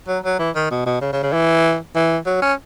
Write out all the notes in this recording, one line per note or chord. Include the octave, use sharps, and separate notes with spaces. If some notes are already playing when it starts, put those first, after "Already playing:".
F#3
F#3
E3
D#3
B2
B2
C#3
C#3
C#3
E3
E3
F#3
C#4